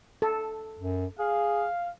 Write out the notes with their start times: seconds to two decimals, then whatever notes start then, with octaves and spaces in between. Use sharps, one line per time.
0.22 A4
0.79 F#2
1.19 G#4 F5